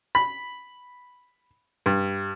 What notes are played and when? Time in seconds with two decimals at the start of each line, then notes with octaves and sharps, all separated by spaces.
0.15 B5
1.86 G2